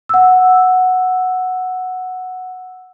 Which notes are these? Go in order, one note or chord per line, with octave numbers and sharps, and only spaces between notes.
F#5 E6